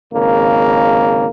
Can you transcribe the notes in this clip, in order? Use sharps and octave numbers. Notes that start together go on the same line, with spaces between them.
G#1 C#3 A#3